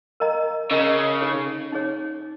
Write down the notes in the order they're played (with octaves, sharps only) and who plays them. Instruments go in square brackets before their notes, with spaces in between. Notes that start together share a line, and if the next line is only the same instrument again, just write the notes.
[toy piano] A#4 D#5 A#5
[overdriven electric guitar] C#3 [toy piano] A#4 D#5 A#5
[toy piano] D#4 G#4 C#5
D#4 G#4 C#5